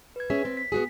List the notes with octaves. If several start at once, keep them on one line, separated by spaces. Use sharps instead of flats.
B4 G#6
C#4 G#4 E5 B6
C4
B6
B3 F#4 G#4